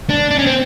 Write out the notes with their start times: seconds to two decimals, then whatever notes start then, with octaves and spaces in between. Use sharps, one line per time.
0.09 D4
0.31 D4
0.39 C#4
0.46 C4